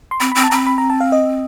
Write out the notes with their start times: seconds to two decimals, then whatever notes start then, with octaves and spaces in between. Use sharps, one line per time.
0.11 C6
0.20 C4 B5
0.32 C4 B5
0.44 A5
0.50 C4 A#5 B5
0.66 B5
0.78 A#5
0.90 A5
1.00 F5
1.12 D#5